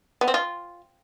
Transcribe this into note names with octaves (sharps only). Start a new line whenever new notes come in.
B3
C4
F4